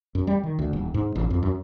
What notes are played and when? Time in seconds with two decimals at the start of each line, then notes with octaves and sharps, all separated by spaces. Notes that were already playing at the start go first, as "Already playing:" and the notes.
0.15 F#2
0.27 G3
0.43 D#3
0.59 D2
0.73 D#1
0.94 G#2
1.15 A1
1.30 F2
1.43 F#2